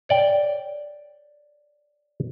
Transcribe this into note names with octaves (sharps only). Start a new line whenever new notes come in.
C#5 D5 G5